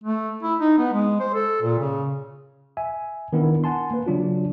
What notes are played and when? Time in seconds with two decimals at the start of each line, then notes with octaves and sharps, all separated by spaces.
0.04 A3
0.43 E4
0.60 D#4
0.78 B3
0.93 G#3
1.20 C5
1.34 A4
1.62 A#2
1.79 C#3
2.77 E5 G#5
3.33 D#3 B3 D4 E4 A#4
3.64 F#5 G#5 A5 C6
3.91 A#3 B4
4.06 C#3 F#3 D4 F4